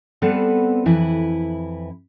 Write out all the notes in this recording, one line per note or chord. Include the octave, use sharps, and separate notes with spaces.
G3 B3 C4 A4 B4 F#5
F2 E3 E4 B4